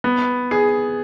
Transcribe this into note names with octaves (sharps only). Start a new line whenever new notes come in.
B3
G#4